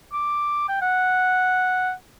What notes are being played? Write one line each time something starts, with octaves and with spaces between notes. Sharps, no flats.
D6
G5
F#5